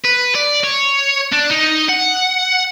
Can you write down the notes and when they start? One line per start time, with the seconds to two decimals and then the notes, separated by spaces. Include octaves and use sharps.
0.04 B4
0.35 D5
0.63 C#5
1.32 D4
1.51 D#4
1.89 F#5